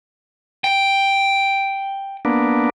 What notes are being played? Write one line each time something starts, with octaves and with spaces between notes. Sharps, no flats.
G5
A#3 B3 D4